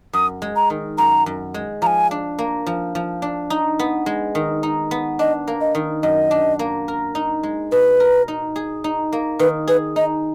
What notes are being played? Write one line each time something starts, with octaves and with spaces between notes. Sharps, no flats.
F#2 D#6
G#3
A#5
D#3
F#2 A#5
F#2
G#3
F3 G#5 A#5
D4
A#3
F3
F3
D4
D#4
B3
G#3
D#3
D#4
B3
D4 D#5
A#3
D#5
D#3
F#2 D#5
D4
A#3
A#4
D#4
G#3
B2 B4
A#4
D#4
G#4
D#4
A#3
D#3 B4
G#4 B4
D#4 D#5